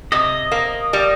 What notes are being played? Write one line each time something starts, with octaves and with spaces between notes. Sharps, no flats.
C3 D#5
A#3
G3